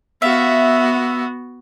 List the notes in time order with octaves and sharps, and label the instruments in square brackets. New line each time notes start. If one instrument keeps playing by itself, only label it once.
[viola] B3 F#4 [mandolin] E5 F5